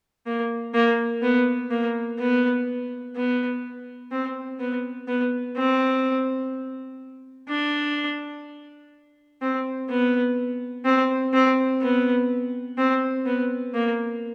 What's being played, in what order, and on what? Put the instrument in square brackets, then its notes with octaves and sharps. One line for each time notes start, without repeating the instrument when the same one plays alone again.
[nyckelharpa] A#3
A#3
B3
A#3
B3
B3
C4
B3
B3
C4
D4
C4
B3
C4
C4
B3
C4
B3
A#3